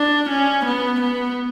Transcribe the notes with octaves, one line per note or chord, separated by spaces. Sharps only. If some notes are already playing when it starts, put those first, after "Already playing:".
Already playing: D4
C#4
B3
B3